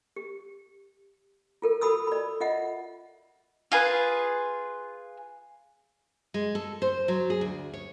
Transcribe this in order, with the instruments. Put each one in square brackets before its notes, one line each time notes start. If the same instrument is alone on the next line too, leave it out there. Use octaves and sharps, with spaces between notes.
[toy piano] G4
F4 A4 A#4
F#4 A4 B5 D#6 E6
D5 B5
F4 D#5 E5 F#5
[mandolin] F4 G#4 B4
[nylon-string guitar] G#3
A4
C5
F#3
G#4
D2
C#5